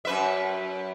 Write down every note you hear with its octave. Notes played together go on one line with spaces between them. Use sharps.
F#2 B4 E5